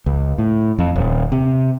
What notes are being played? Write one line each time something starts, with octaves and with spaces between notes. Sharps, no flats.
C#2
A2
F2
D#1
C3